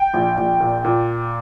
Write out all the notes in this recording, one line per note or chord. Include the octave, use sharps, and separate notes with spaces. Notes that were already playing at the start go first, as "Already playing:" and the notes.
Already playing: G5
A#1
A#1
A#2
A#2